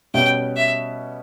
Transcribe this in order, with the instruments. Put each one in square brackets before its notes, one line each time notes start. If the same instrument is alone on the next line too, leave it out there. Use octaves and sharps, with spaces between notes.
[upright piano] B2 G3 C#4 F#4 [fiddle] G5
[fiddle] E5